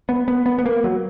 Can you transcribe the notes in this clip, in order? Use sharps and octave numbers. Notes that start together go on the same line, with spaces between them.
B3
B3
B3
B3
A#3
F#3